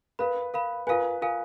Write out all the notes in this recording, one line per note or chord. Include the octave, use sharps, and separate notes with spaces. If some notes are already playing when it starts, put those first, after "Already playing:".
A#4 B4 F5 B5
A#4 F5 B5
F4 A#4 B4 F5 G#5
F4 A#4 F5 G#5